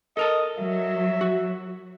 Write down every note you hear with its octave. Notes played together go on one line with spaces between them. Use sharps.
A4 A#4 D#5 A5
F#3 E5
F#4